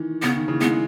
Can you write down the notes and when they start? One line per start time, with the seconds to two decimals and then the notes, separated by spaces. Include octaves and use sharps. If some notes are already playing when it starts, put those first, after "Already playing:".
Already playing: D#3 E3
0.23 C#3 B3
0.36 D#3
0.48 C#3 E3
0.61 E3 G#3 B3